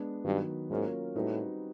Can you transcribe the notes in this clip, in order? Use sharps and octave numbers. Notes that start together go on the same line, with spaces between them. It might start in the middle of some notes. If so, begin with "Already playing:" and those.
Already playing: G#3 B3 D4
G2 D#3 F#3 B3
G#2 F#3 A#3 C#4 F4 A#4
A2 G3 C4 D#4 F#4 B4